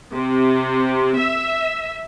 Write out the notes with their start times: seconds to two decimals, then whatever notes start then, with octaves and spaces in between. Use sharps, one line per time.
0.14 C3
1.19 E5